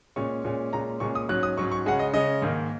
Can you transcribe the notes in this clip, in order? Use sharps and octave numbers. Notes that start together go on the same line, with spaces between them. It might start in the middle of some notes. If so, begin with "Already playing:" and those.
A#2 G#3 C#4 C#6
A#2 G#3 C#4
A#2 G#3 C#4 A#5
A#2 G#3 C#4 C#6
D#6
G#2 F#3 C#4 F#6
D#6
G#2 F#3 C#4 C#6
C#6
C#3 G#3 C#4 F#5
D#5
C#3 G#3 C#4 D#5
G#2 D#3 A#3